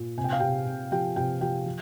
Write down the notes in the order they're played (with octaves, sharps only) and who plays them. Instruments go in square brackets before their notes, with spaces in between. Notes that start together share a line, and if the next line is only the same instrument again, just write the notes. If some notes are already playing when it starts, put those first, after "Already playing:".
Already playing: [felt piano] A#2
C3 G#5
G5
F5
C3 G4 G5
C3
F3 G4 G5
C3 G4 G5
F3 G4 G5
F3